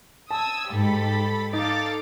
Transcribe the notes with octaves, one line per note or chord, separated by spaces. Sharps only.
A5 D#6 E6 G#6
G#2 G4 A4 B5
D#4 A4 F5 D6 A6